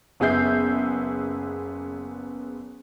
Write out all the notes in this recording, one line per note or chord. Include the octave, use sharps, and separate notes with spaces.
F#1 B3 G#4 E5 G6 C7